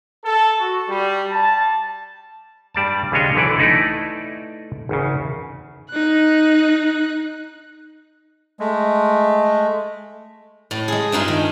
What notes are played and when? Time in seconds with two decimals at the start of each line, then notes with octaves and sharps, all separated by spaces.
0.25 A4
0.59 F#4
0.89 G3
1.32 A5
2.74 G2 G3 D5 A5
3.12 D#2 C#3 G#3 D4 C#5 D#5
3.35 B1 D3 E3 E4 A4 D5
3.59 A3 D#4 E4 A4 B4 D5
4.89 G#1 E2 C#3
5.90 D#4 F#6
8.60 G#3 A3
10.71 A2
10.88 G#3 G#4
11.12 G2 G#3 D#4 F4
11.28 D#3